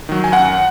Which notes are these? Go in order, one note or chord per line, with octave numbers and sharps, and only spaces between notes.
D#3 F#3
G#5
F#2 F#5